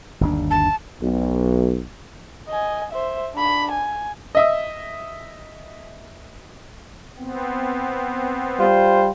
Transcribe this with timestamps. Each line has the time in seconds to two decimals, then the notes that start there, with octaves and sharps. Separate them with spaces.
0.21 G1 D#2 D4
0.51 A5
1.02 B1
2.49 D#5 G#5
2.92 C5 E5
3.35 D4 B5
3.71 G#5
4.35 D#5 E5 D#6
7.18 B3 C4
8.59 G3 F4 C5